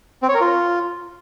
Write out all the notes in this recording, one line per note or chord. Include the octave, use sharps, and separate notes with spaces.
C4
C#5
A#4
F4